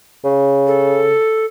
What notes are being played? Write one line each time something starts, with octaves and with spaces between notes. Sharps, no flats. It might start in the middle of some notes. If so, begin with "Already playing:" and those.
C#3
A4